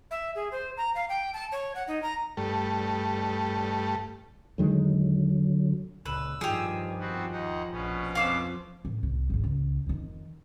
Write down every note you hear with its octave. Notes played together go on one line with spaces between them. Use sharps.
E5
G#4
C5
A#5
F5
G5
A5
C#5
F#5
D#4
A#5
G2 A3
E2 D3 D#3 F#3 G#3
C#2 A#2 B4 E6
G2 D#3 F3 G4 G#4
B3 C4 F#4
D#2 D#4 F#5
A#1 B2 B3 C#4
F2 C4 F5 D6 E6
A2
C2
G#1 E2
C#2
F2 D#3